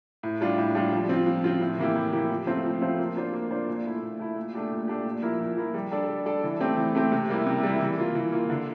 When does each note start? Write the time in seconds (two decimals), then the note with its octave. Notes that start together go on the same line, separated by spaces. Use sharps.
0.23 A2
0.41 G3 D4 F4
0.58 A2
0.75 G3 D4 F4
0.93 F3
1.09 C4 F4
1.26 F3
1.44 C4 F4
1.61 A2
1.78 E3 A#3 E4 G4
1.95 A2
2.13 E3 A#3 E4 G4
2.30 F3
2.47 A3 C4 F4 C5
2.64 F3
2.82 A3 C4 F4 C5
2.99 A#3
3.16 D4 F4 C5
3.33 A#3
3.51 D4 F4 C5
3.68 A#2
3.85 A3 E4
4.02 A#2
4.19 A3 E4
4.37 A#2
4.53 A3 D4 G4
4.70 A#2
4.88 A3 D4 G4
5.05 A#2
5.22 F3 A#3 E4 A#4
5.40 A#2
5.57 F3 A#3 E4 A#4
5.74 G3
5.92 D4 A4 D5
6.08 G3
6.26 D4 A4 D5
6.44 E3
6.61 A3 C4 G4
6.77 E3
6.95 A3 C4 G4
7.12 C3
7.29 G3 A#3 E4
7.47 C3
7.63 G3 A#3 E4
7.81 E3
7.98 A#3 F4
8.15 E3
8.32 A#3 F4
8.50 D3